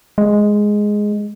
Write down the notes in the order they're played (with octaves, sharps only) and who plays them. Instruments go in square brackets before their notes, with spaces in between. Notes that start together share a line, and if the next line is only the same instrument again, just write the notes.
[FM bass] G#3